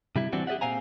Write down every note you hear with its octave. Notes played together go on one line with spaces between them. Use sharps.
C3 G3 E4
E3 G3 C4 D4 F#4
G4 G#4 D5 E5 F#5
A#2 C4 F5 G#5 A#5